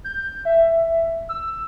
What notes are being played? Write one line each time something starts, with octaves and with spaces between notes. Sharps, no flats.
G6
E5
E6